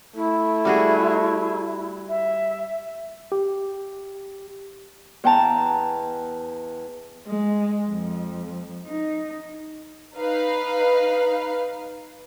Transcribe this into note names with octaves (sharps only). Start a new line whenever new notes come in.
A3 E4
G3 F#4 G#4
E5
G4
E2 G5 A5 A#5
G#3
F2
D#4
D#4 B4 F5